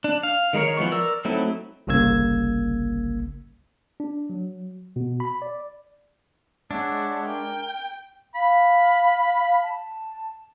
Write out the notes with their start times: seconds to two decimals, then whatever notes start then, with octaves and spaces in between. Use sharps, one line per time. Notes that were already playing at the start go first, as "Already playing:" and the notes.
0.04 D4
0.23 F5
0.53 D#3 G#3 A#4 C#5
0.77 E3 F3 B3 C#6
0.92 A#4 D5 E6
1.25 F#3 A3 C4 D#4 E4
1.87 G1 C2 C#3 A#3 E6 G#6
4.00 D4
4.30 F#3
4.96 B2
5.20 B5
5.42 D5
6.71 G#3 D4 C#5 E5 F#5
7.26 A#4 G5
8.35 F5 B5
9.63 A5